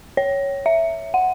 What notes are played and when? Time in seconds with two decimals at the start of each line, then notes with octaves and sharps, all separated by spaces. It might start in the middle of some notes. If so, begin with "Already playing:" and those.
0.17 C#5
0.66 E5
1.14 F#5